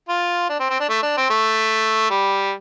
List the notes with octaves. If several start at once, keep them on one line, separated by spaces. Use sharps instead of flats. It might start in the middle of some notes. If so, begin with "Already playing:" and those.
F4
D4
C4
C4
D4
A3
D4
C4
A3
G3